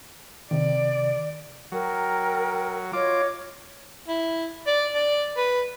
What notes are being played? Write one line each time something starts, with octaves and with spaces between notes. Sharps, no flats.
C3 D#3 D5
F#3 A#4 G5
F4 C#5 D#5 D6
E4
D5
D5
B4